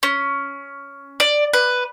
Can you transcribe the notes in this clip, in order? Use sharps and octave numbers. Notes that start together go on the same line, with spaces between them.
C#4
D5
B4